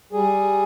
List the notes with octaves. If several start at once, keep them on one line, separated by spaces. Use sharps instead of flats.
G3 G#4